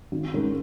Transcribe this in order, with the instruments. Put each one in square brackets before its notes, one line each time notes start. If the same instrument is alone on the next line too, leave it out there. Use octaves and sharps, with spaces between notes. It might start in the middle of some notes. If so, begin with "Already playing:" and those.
[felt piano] G#1
G#2 G#3 C#4 A#4